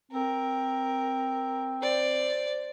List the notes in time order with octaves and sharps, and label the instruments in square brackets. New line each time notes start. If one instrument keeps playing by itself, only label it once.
[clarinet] C4 [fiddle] A#4
[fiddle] C5 D5